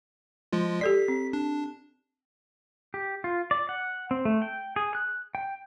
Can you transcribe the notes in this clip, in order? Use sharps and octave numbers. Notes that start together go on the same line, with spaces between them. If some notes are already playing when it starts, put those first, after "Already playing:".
F3 G#3 F4
G4 A4 D5 B6
C4
D4
G4
F4
D5
F#5
C4
A3
G5
G#4
F#6
G5